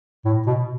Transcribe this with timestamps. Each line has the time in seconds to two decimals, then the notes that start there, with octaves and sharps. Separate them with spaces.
0.25 A2
0.46 B2